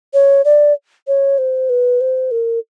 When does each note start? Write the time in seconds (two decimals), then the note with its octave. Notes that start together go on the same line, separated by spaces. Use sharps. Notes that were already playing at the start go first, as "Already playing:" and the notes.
0.14 C#5
0.45 D5
1.07 C#5
1.38 C5
1.70 B4
2.01 C5
2.31 A#4